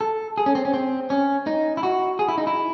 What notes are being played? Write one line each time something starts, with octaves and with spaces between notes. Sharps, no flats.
A4
G#4
C#4
C4
C#4
C4
C#4
D#4
E4
F#4
G#4
E4
D#4
E4